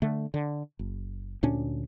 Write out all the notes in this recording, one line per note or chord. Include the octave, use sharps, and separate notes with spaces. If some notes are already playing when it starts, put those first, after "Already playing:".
D3 A3
D3
F#1
D2 A#2 C#4 D4